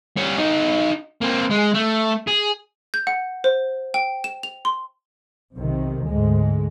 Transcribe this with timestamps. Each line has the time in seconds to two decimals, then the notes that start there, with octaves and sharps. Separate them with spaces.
0.17 G3 C#5
0.38 D#4 F#4
1.21 A#3 C4
1.50 G#3
1.74 A3
2.27 G#4
2.94 G6
3.07 F#5
3.44 C5
3.94 G5
4.24 E7
4.43 F7
4.65 C6
5.55 B1 C3 D#3
6.04 D2 G#2 G#3